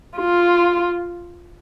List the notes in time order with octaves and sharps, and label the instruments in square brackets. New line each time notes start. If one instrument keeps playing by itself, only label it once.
[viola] F4